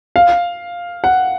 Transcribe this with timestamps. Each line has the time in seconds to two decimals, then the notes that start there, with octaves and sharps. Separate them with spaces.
0.16 F5
1.04 F#5